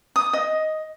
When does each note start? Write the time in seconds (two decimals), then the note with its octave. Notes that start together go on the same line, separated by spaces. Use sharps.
0.16 D#6
0.33 D#5